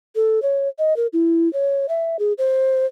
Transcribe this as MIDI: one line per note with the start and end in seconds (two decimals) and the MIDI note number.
0.16 0.42 69
0.42 0.68 73
0.79 0.96 75
0.96 1.07 70
1.13 1.51 64
1.53 1.86 73
1.89 2.17 76
2.19 2.33 68
2.38 2.86 72